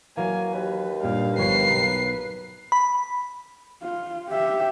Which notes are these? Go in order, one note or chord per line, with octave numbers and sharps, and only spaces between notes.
E3 F#3 A#3 G#5
D#2 B4
G2 A#2 G3 F5
G1 F3 B4 C#5 C7
B1 A#5
B5
F4
G4 E5